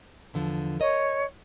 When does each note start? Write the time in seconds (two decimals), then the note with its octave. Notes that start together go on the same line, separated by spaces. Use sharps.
0.34 E2 D3 F3
0.80 A#4 C#5 D#5